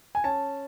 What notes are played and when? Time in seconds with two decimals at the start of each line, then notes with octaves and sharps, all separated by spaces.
0.15 G#5
0.24 C#4 A5